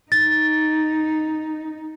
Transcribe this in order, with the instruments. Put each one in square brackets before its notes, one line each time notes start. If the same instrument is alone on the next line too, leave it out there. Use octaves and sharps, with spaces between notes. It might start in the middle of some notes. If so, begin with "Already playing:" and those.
[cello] D#4 [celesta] A6